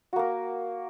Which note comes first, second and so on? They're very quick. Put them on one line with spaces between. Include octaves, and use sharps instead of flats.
F#4 A#3 A#4